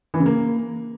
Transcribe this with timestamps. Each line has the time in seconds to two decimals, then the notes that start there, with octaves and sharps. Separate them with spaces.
0.14 E3
0.20 C#3
0.26 A#3